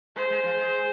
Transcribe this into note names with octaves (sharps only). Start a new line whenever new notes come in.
G#3 C5
G#3
F3
G#3